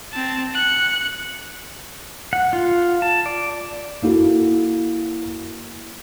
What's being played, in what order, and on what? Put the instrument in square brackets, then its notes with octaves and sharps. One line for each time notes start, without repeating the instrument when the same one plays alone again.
[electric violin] C4 A5
F#6 C#7
[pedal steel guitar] F#5
F4
A5
D5
[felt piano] A#3 E4 F#4 A4